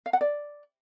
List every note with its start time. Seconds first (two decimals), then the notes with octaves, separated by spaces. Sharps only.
0.06 F5
0.13 F#5
0.21 D5